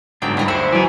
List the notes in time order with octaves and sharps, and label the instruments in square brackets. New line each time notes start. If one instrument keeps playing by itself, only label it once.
[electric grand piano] G1 [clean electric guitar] G#2 F#3 D4 [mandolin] G5 G6
[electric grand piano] G2 [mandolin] E4 A#4 D#5
[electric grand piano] D2 C#7 [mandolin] C4 G#4 C5 [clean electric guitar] E5 B5
[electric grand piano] E3 F#3 [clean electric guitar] D5 G#5